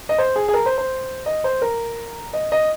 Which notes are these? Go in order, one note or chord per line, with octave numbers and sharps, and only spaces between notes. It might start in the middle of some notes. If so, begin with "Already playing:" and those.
D#5
C5
G#4
G#4
A#4
C5
C5
D#5
C5
A#4
D#5
D#5